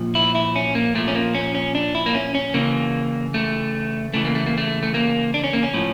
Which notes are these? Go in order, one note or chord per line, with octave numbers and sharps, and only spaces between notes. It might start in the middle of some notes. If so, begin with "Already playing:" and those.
Already playing: A#2 F3
E4
E4
C#4
A#3
A#2 F3 A3
C#4
A#3
C#4
C#4
D4
E4
A#3
C#4
C#4
C#3 E3 A#3
A3
C#3 E3 A3
A#3
A3
A#3
A3
A3
A#3
D4
C#4
A#3
C#4
A2 F3